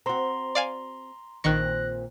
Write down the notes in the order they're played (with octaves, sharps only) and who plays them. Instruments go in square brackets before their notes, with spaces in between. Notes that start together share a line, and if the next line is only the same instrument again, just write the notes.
[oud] C4 F#4 [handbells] A#5 C6
[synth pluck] D5 F5 G#5
[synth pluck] A#1 D#3 C#6 [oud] A#2 C4 [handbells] F#6 A#6